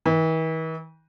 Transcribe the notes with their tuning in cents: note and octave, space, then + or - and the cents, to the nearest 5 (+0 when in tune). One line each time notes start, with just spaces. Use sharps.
E3 -45